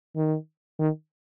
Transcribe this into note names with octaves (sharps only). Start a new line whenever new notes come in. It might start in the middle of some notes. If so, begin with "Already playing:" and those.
D#3
D#3